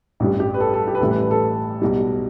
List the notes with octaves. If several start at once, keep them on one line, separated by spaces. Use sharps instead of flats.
A1 G2 G3
G4
B4
A4
A4
G4
B4
A1 A2 E3 G3 A4
B4
B4
A4
B1 B2 G3